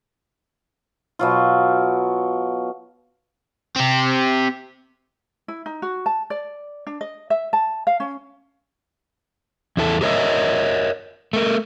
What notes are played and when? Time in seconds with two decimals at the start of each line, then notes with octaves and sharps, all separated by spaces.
1.19 B2 F#3 F4
3.76 C4 G4
5.48 E4
5.66 D#4
5.82 F#4
6.06 A5
6.30 D5
6.87 D4
7.01 D#5
7.30 E5
7.53 A5
7.87 F5
8.00 C#4
9.77 E2 E4 A4
10.01 G4 G#4 A#4 C#5 D#5 E5
11.33 A3 A#4